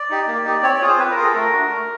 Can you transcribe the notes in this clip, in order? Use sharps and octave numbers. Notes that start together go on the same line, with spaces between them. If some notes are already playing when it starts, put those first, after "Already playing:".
Already playing: D5
D#4 G4
A#3
D#4 G4
C4 C#5
D5
C#5
F4 G#4
C5
C4 B4
A#4
F4 G#4
A4
A3 A#4
D4 F#4
A3